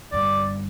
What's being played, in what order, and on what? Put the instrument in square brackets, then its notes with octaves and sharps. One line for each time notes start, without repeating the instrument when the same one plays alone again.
[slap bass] G1 G2 G3 [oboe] D5